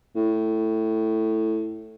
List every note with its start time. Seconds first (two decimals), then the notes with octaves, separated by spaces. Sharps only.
0.16 A2